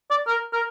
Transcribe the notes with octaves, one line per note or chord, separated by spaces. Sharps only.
D5
A#4
A#4